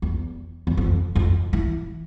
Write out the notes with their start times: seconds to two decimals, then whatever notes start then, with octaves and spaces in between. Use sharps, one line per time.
0.02 E2
0.67 E2
0.77 F2
1.15 F2
1.53 E3